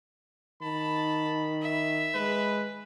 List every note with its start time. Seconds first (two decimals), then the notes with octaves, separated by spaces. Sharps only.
0.62 D#3 A5 B5
1.62 E5
2.15 G#3 B4